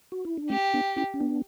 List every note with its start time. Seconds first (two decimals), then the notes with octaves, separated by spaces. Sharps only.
0.12 F#4
0.25 E4
0.37 D4
0.49 A3 C#4 G4
0.74 B3 D4
0.96 C#4 E4
1.14 C#4
1.20 B3 D4